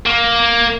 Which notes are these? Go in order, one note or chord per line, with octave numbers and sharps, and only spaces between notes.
A#3